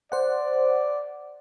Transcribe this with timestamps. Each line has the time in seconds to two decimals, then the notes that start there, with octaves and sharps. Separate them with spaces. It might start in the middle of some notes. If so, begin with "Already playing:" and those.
0.12 C5 D5 F#5